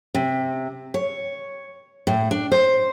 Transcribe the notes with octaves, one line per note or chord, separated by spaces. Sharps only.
C3
C#5
A2
D4
C5